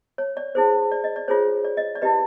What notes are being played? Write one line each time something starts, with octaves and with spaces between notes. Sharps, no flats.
C#5
D5
E4 G#4 C5
D5
D#5
D5
F4 G#4 C5 C#5
D5
D#5
D5
E4 G4 B4 D#5